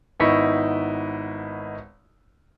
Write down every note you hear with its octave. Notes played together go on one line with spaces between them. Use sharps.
G#1 B3 D#4 E4 C#6 B6